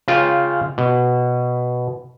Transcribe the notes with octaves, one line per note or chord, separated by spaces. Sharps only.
C#3 F4 G5
B2